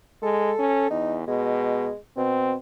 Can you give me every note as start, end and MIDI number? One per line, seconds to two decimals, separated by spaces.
0.23 0.52 56
0.23 0.87 69
0.59 0.90 61
0.90 1.24 40
0.90 1.16 63
1.28 1.89 47
1.28 1.97 56
2.17 2.55 47
2.17 2.55 60